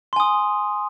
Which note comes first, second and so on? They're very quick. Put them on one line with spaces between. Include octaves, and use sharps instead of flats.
C6 G#5 D#6